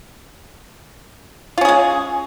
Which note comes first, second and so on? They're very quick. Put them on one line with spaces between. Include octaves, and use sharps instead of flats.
F4 C#4 G#4 G#3